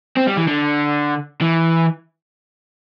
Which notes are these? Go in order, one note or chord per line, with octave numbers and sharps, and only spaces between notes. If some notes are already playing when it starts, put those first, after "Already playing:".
C4
G3
E3
D3
E3